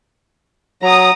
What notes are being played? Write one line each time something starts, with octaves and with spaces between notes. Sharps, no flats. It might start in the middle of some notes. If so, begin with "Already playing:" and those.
F#3 A#5 D#6